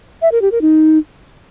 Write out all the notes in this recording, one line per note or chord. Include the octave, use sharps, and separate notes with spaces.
E5
A#4
G4
A#4
D#4